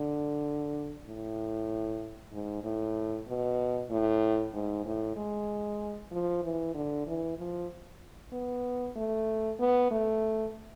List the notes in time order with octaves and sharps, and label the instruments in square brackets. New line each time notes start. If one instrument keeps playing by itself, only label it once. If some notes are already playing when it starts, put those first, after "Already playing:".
Already playing: [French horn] D3
A2
G#2
A2
B2
A2
G#2
A2
G#3
F3
E3
D3
E3
F3
B3
A3
B3
A3